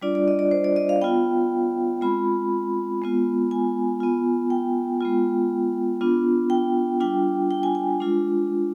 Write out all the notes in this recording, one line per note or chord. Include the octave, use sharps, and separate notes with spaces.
G3 D4 F4 D5
D5
D#5
D5
C5
D5
D#5
F5
B3 F4 G5
G#3 C4 F4 B5
G#3 B3 F4
G#5
B3 F4
G5
G#3 B3 F4
B3 D4 F4
G5
G3 D4 F4 G5
G5
G#5
G#5
G#3 D4 F4